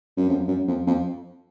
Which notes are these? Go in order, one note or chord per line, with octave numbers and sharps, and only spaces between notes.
F#2
F2
F#2
F2
F2